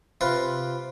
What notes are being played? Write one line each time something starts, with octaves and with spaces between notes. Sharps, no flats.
C3 F4 B4